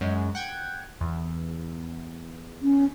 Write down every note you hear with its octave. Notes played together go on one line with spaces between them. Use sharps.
F#2 G#3
F#5 G5 G#6
E2
C#4